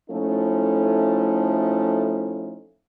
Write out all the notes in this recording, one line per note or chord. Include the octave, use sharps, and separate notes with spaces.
F3 A3 C#4 D#4 E4 A4